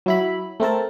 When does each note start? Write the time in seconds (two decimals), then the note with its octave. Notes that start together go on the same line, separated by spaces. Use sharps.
0.06 F#3 E4 B5
0.60 A3 C4 A#4 A5